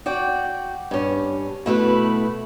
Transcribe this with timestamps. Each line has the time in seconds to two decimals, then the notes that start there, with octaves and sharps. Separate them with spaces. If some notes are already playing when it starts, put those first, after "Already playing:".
0.06 F#4 D5 G5
0.91 G2 C#4
1.66 B2 A3 E4 B4